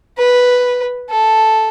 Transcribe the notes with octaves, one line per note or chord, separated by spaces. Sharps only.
B4
A4